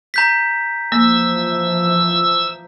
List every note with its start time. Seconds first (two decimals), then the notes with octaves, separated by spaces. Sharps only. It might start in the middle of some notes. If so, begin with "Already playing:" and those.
0.14 A#5 G6 B6
0.92 E3 F3 A#3 E6